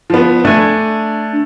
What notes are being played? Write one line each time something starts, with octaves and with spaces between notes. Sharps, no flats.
F3 B3
A3 D4 G#5